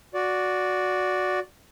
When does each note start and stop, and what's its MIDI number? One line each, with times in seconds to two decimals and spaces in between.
0.14 1.40 66
0.14 1.40 74